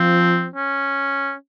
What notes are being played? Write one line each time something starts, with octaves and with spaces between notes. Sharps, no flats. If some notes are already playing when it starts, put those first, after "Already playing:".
Already playing: F3 C4
C#4